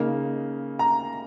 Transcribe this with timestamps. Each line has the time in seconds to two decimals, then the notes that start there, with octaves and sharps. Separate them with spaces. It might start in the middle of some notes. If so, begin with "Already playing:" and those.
Already playing: C#3 A#3 D#4
0.79 A#5